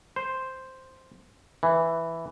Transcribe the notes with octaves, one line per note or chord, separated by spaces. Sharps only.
C5
E3